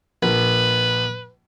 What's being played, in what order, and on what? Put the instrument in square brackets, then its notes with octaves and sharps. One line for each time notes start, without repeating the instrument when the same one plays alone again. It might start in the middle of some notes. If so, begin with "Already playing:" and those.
[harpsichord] A#1 [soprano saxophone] B4